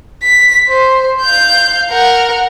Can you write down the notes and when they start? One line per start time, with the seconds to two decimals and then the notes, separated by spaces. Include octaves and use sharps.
0.23 B6
0.69 C5
1.21 F5 G6
1.90 A#4 F#5